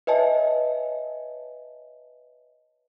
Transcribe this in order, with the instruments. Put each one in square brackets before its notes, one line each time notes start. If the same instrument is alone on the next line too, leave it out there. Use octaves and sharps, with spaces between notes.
[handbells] B4 C#5 D#5 E5 G#5 A5